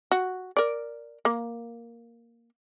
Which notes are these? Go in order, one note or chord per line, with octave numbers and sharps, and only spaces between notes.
F#4
A#4 D5
A#3